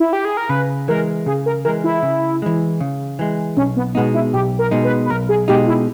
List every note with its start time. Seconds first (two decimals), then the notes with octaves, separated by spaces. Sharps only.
0.00 E4
0.13 G4
0.25 G#4
0.37 A#4
0.49 C#3 B4
0.88 E3 G#3 A#4
1.26 C#3 G#4
1.46 A#4
1.65 E3 G#3 A#4
1.84 E4
2.03 C#3
2.42 E3 G#3
2.80 C#3
3.19 E3 G#3
3.57 B1 C#4
3.77 B3
3.95 B2 G#3 B3 D#4
4.14 E4
4.33 B1 G4
4.59 A#4
4.71 B2 G#3 D#4
4.84 B4
5.06 B4
5.10 B1 A#4
5.29 G#4
5.48 B2 G#3 D#4 G4
5.68 E4